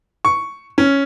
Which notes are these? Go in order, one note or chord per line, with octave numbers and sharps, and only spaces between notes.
C#6
C#4